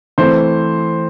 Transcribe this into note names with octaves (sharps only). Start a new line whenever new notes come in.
E3 A3 C4 C5